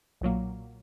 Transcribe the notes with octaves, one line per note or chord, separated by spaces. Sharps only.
B1 A#2 F#3 A#3